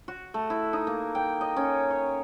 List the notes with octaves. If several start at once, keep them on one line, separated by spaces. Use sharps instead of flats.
F#4
A3
E4
D#4
A#3
G5
D#5
C#4
C#5